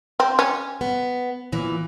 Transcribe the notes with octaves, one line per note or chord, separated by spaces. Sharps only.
C4
C#4
B3
A#2 E3